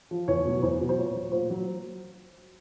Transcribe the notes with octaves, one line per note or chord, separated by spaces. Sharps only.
F3
E2 C#5
B2 F#3
E2 C5
B2 F#3
C5
A#2 C#5
F#3
A#2 C5
F#3